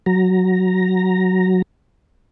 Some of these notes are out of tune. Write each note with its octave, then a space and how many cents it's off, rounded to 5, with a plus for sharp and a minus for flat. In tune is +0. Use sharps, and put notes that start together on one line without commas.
F#3 +0 A#5 +0